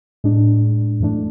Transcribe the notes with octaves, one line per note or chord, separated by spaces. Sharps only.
A2 G#3 D4
F#2 E3 A3 D4